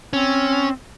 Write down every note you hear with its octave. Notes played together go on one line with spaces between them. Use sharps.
C4 C#4